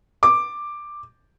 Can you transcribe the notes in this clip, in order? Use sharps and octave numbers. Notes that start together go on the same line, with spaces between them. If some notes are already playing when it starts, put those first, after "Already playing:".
D6